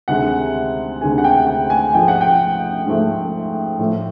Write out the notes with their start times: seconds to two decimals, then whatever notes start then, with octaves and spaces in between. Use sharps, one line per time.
0.08 D2 C3 D#3 G#3 F#5
1.01 D2 C3 D#3 G#3 G#5
1.18 F#5
1.24 G5
1.47 G5
1.70 G#5
1.94 G#2 F3 A3 G5
2.08 F#5
2.21 G5
2.86 G#2 F3 A3
3.79 A2 F3 A3